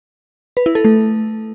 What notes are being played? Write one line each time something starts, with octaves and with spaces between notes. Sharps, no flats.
B4
E4
A4
A3